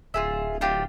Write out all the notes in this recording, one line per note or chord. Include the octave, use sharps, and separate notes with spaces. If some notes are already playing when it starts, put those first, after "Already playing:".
D1 F4 G#4 E5
D4 F4 G4